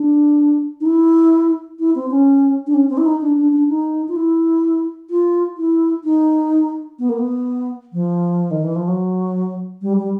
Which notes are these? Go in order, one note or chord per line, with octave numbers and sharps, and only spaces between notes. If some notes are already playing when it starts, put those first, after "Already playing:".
Already playing: D4
D#4
E4
E4
C4
C#4
D4
C#4
C4
E4
D#4
D4
D4
D4
D#4
F4
E4
F4
E4
D#4
B3
A#3
B3
F3
D#3
E3
F3
F#3
G3
G3